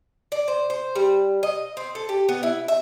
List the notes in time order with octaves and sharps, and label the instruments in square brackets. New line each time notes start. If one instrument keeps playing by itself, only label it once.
[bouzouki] D5
C5
C5
G3
D#5
C4
A4
G4
B3
E4
E5